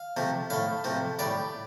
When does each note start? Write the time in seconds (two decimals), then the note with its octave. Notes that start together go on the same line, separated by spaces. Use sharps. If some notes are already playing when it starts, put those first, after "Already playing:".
Already playing: F5
0.17 C3 F3 A3
0.50 A2 A3 F5
0.84 C3 F3 A3
1.19 A2 G3 D5